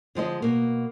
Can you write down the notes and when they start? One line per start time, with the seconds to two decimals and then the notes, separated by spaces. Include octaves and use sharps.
0.15 D3 F3 G#3 D#5
0.42 B2 A#3